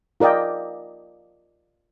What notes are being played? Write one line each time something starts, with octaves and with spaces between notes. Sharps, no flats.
F4 A#4 D5 D#5 G5